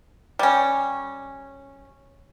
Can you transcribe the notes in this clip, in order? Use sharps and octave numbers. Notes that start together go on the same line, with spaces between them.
G3 C#4